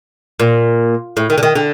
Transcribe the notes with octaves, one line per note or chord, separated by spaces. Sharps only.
A#2
A2
D#3
D3
D#3
D3